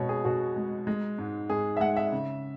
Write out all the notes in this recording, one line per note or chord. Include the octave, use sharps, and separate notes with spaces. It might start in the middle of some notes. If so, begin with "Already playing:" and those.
Already playing: B2 G#3 C#5
G#4
B2 F#4
G#3
G#3
G#2
G#2 G#4
E5
G#3 F#5
E5
C#3